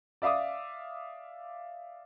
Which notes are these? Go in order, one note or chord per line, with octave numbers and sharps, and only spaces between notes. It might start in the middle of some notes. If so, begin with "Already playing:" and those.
D5 E5 F5 D6 D#6